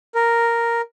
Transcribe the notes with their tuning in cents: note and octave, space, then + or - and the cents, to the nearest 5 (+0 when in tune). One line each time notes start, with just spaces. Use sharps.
A#4 +0